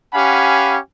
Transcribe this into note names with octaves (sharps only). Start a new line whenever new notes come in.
C#4 G4 F5 F#5 G#5 B5